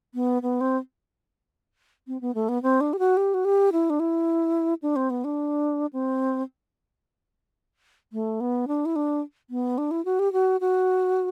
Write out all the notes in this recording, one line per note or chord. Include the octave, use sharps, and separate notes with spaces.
B3
B3
C4
C4
B3
A3
B3
C4
D4
G4
F#4
G4
F#4
G4
E4
D4
E4
D4
C4
B3
D4
C4
A3
B3
D4
E4
D4
B3
D4
E4
F#4
G4
F#4
F#4